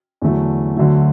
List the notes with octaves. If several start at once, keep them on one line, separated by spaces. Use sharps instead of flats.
E2 D3 F#3 A3
D2 D3 F#3 A3